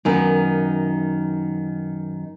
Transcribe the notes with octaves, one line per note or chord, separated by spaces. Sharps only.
F#2 D#3 B3